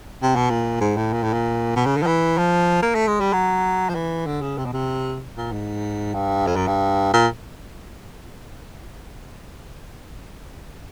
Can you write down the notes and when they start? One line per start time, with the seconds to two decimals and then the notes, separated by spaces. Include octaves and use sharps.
0.23 C3
0.36 B2
0.50 A#2
0.81 G#2
0.97 A2
1.13 A#2
1.23 A2
1.33 A#2
1.76 B2
1.86 C#3
1.97 D3
2.03 F3
2.07 E3
2.38 F3
2.82 A#3
2.95 A3
3.08 G#3
3.20 G3
3.33 F#3
3.89 F3
3.95 E3
4.26 D3
4.42 C#3
4.58 C3
4.66 B2
4.73 C3
5.37 A#2
5.52 G#2
6.14 G2
6.47 F2
6.56 F#2
6.68 G2
7.14 A#2